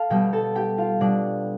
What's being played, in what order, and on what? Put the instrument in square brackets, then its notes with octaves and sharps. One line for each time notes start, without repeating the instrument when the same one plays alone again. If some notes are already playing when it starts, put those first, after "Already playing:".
Already playing: [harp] A4 F5 A5
B2 G3 G4 G5
A4 A5
G4 G5
F4 F5
B2 G3 D4 D5